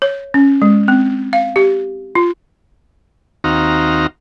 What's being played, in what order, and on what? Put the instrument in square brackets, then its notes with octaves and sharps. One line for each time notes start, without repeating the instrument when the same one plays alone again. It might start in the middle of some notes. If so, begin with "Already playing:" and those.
[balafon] C#5
C#4
G#3
C4
F5
G4
F4
[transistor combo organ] D#2 C4 D#4 F#4 F5 A#5